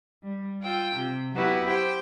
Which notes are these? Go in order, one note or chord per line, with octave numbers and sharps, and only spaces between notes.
G3
F4 G5 E6
C3
F#3 B3 E4 F#4 G4 B4
G4 C5 G5